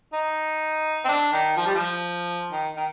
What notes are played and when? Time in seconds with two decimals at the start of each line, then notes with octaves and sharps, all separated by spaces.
0.13 D#4
1.05 C4
1.09 D4
1.32 D#3
1.57 F3
1.66 G3
1.75 F3
2.52 D#3
2.76 D#3